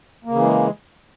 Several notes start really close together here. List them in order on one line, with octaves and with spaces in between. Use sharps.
A#3 C#3 E3 G#3